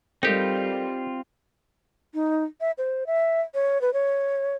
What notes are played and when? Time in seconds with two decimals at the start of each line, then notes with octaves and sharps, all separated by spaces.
0.23 G3 C4 D#4 F4 G4 A4 A#4
2.14 D#4
2.61 E5
2.78 C5
3.07 E5
3.54 C#5
3.81 B4
3.93 C#5